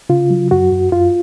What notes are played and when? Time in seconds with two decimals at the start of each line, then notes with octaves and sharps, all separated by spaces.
0.09 C#3 F4
0.30 F#3
0.51 F#2 F#4
0.72 F#2
0.92 F#2 F4